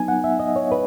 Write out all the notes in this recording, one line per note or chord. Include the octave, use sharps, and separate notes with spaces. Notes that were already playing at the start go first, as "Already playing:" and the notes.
Already playing: F#3 B3 D#4 G#5
F#5
E5
D#5
C#5
B4